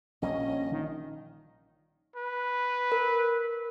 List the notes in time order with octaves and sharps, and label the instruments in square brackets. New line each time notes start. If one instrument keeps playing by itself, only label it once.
[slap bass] A#1 A#2 G3 [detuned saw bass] C#4 [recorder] D#5
[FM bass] D#3
[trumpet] B4
[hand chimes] A#4